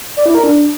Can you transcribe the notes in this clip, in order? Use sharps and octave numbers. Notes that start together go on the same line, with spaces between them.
D5
E4
A#4
D4